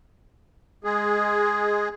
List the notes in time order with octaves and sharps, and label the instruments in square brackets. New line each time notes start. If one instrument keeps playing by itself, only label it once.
[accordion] G#3 G#4